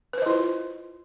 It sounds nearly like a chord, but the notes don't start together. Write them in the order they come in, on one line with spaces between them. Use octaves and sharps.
B4 C5 D#5 E4 F4